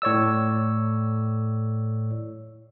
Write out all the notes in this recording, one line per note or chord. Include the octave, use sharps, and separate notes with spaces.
A2 C#5 D5 E6